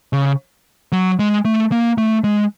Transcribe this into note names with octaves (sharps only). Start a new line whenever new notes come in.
C#3
F#3
G#3
A3
A#3
A3
G#3